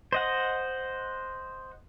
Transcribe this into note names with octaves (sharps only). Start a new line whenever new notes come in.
C5 D#5 F#5